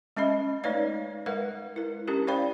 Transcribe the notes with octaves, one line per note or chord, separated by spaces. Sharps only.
G#3 C#4 D#5 E5 B5
A3 D#4 B4 C#5 D5 F5
G#3 A#4 B4 F5 F#5
E4 A#4
C#4 D4 E4 G4 A#4
C5 D5 F5 G5 B5